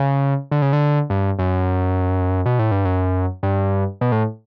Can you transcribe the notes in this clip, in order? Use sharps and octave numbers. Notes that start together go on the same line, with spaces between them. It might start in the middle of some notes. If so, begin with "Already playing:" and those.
Already playing: C#3
D3
C#3
D3
G2
F#2
B2
A2
G2
F#2
G2
B2
A2